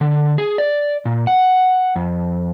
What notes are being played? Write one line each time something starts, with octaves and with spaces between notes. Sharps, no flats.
D3
G#4
D5
A#2
F#5
F2